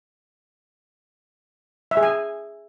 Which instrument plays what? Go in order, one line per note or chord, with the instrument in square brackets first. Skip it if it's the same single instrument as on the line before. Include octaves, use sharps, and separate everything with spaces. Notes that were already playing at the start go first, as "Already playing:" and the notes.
[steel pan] E5
G#4
G#5